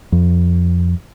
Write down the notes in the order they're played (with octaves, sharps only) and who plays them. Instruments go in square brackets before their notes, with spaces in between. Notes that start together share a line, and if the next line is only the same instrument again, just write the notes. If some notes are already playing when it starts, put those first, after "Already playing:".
[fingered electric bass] F2